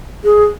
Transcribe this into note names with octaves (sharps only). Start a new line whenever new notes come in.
G#4